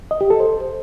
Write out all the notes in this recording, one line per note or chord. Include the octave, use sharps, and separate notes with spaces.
D#5
G4
A4
C5